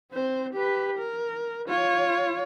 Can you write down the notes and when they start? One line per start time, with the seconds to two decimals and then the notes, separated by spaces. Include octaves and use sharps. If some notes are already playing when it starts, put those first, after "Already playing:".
0.11 C4 C5
0.53 G4 B4
0.98 A#4
1.68 F4 C#5